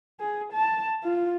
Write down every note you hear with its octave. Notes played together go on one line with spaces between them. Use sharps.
G#4
A5
F4